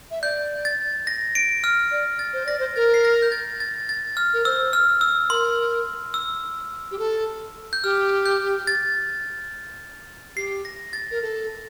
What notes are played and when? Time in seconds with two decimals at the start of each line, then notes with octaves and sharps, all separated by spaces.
0.11 E5
0.22 D5 G6
0.65 A6
1.07 A#6
1.35 D7
1.64 F6
1.91 D5
2.19 A6
2.33 C5
2.46 D5 A#6
2.59 C5
2.76 A#4 A6
2.94 C7
3.05 A#6
3.22 G6
3.32 A6
3.60 A6
3.89 A6
4.17 F6
4.34 A#4
4.45 C5 E6
4.73 F6
5.01 E6
5.30 A#4 C6
6.14 E6
6.91 G4
6.99 A4
7.73 G6
7.84 G4 F6
8.26 G6
8.67 A6
10.36 G4 C7
10.65 A#6
10.93 A6
11.11 A#4
11.22 A4